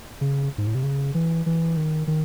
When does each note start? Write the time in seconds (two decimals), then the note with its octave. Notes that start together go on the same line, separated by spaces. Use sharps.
0.21 C#3
0.58 G#2
0.67 A2
0.75 C3
0.83 C#3
1.14 E3
1.46 E3
1.77 D#3
2.07 D#3